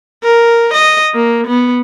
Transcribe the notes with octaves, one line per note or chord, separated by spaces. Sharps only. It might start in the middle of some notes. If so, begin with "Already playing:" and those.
A#4
D#5
A#3
B3